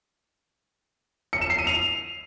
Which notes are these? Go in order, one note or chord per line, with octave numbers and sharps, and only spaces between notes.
C#7
E7
C7
D#7
F7